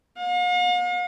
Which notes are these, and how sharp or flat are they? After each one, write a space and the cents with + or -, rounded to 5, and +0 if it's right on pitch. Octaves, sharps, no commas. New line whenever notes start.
F5 +45